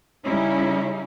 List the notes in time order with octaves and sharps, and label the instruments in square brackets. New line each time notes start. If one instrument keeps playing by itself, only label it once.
[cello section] C#3 G3 C#4 D#4 E4